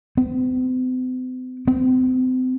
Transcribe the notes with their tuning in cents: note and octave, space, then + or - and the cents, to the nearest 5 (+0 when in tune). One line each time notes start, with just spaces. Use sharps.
C4 -45
C4 -35